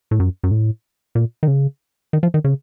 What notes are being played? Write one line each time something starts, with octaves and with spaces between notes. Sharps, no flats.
A2
F#2
F#2
A2
A#2
D#3
C#3
D#3
F3
D#3
C#3